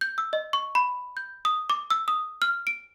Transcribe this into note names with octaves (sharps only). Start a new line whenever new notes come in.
G6
E6
D#5
C#6
B5
G6
D#6
D6
E6
D#6
F6
D7